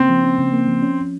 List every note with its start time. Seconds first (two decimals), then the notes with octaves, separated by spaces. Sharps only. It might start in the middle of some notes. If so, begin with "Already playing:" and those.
Already playing: C#3 A#3 C4 C#4
0.09 F3
0.23 C#4
0.38 C#3
0.53 A#3
0.68 F3
0.82 C#4